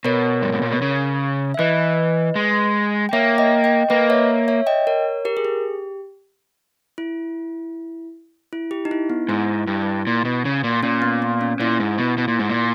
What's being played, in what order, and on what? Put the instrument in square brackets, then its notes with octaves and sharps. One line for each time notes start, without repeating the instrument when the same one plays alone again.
[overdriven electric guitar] B2 [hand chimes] A#4 C#5
[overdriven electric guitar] G2
G#2
A#2
B2
C#3
[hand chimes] E5
[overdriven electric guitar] E3 [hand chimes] B4 D#5
[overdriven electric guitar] G#3
[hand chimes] G5
[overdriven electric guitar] A#3 [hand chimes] C#5 E5
[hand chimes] D#5 G5
D#5 G5
[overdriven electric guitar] A#3 [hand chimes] B4 D#5
[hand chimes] C#5 E5
C#5 E5
D#5 G5
A#4 C#5
G4 A#4
G#4
G4
E4
E4
G4
D#4
E4
B3
[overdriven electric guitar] G#2 [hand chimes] E4
[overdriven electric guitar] G2
A#2
B2
C#3
A#2
[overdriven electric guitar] A#2 [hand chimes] C#4
[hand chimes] B3
B3
C#4
[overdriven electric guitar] A#2 [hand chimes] E4
[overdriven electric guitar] G#2
B2
B2
A#2
G#2
A#2